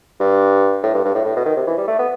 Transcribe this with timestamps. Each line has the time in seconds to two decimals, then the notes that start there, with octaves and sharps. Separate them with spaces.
0.20 G2
0.83 A2
0.93 G2
1.05 G2
1.15 A2
1.25 A2
1.36 B2
1.46 D#3
1.56 C3
1.67 E3
1.77 G3
1.87 A3
1.98 B3